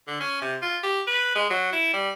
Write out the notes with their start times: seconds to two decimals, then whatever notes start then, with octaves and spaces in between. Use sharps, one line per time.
0.07 D3
0.20 C#4
0.42 C3
0.62 F4
0.83 G4
1.07 B4
1.35 G#3
1.50 F#3
1.73 E4
1.93 G3